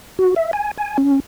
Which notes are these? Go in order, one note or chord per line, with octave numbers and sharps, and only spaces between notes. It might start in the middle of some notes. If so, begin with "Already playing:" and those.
F#4
E5
G#5
G#5
C#4